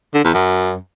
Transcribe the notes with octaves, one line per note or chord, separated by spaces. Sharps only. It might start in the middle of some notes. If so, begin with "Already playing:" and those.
D3
E2
F#2